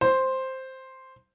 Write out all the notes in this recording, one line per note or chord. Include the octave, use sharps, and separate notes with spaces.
C5